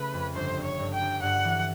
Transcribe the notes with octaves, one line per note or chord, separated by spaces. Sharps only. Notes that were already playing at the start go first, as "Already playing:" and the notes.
Already playing: C#3 A3 B4
F2
G1 C5
G2
C#5
G2
G5
G1
G2 F#5
E3